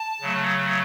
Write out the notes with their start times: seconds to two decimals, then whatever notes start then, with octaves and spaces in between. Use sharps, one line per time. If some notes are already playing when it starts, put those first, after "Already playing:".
Already playing: A5
0.21 C#3 F#3 A3